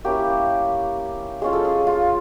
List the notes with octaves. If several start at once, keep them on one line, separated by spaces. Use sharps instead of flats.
A#3 C#4 E4 G4
G#3 C#4 F4 G#4
A4
G#4
F4